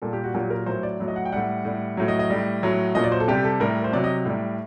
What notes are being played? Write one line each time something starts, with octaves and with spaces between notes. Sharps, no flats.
A#2 G3 A4
G4
F#4
A#2 F#3 G4
A#4
A2 F#3 C5
D5
A2 F#3
D#5
F#5
G5
A2 G3 F#5
A2 G3
A2 F#3
D#5
D#5
A2 G3
A2 F#3
A#2 F#3 D#5
D5
C5
A4
C3 G3 G4
A4
A2 G3 A#4
C5
C3 F#3 D5
D#5
A2 G3